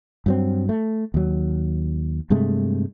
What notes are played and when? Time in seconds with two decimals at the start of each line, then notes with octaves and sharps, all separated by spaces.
0.26 G2 F#3 C4
0.69 A3
1.14 D#2 F#3
2.30 G2 C3 G#3 A3